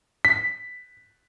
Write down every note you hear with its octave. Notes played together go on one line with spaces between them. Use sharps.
B6